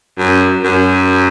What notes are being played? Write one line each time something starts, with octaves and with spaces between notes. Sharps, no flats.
F#2
F#2